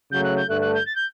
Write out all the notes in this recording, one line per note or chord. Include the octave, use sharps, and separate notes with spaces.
C#3 F#3 A3 G6
F#6
G6
G2 D3 A3 F#6
F#6
G6
A6
G6